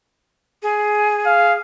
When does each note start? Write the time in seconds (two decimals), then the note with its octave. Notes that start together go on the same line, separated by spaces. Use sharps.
0.63 G#4
1.26 F5